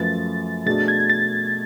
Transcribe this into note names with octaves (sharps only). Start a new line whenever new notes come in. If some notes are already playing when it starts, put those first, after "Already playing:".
Already playing: F#2 F3 A3 F4 B4 A6
B2 A3 D4 G#4 A6
G#6
A6